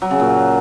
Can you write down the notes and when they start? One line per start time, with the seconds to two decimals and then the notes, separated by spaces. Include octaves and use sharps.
0.02 F#3
0.11 C#3
0.20 A#2